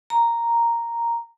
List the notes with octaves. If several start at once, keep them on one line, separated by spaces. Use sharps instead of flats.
A#5